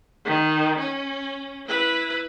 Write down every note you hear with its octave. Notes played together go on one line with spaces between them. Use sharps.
D#3
C#4
E4 B4